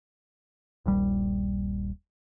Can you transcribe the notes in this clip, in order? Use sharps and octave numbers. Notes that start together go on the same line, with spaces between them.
D#1 A#1 G3